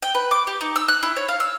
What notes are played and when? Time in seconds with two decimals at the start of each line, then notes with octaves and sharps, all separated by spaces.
0.02 G5
0.15 B4
0.31 D6
0.47 G4
0.61 D#4
0.76 E6
0.88 F#6
1.03 E4
1.16 C#5
1.28 F5
1.40 E6